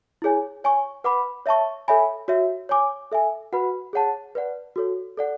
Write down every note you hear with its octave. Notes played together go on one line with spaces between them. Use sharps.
E4 G#4 C#5 G#5
C#5 G#5 C#6
B4 F#5 B5 D6
C#5 E5 A5 C#6
A4 C#5 E5 G#5 B5
F#4 C#5 E5
C#5 G#5 D6
A4 E5 G#5
F#4 B4 F#5 B5
G#4 C#5 F#5 A5
B4 D5 F#5
F#4 A4 C#5
A4 D5 F#5